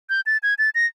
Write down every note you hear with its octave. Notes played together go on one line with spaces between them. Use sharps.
G6
A6
G#6
A6
A#6